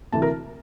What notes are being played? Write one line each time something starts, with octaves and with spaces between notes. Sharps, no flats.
D2 C3 E3 A3 A5
A#4